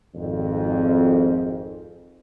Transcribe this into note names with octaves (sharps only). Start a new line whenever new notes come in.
G#1 F2